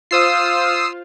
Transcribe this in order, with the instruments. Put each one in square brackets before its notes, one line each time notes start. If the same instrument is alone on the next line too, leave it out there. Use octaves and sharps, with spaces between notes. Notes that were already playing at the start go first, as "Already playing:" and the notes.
[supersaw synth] F4 C5 F5 [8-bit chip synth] D#6 E6 C7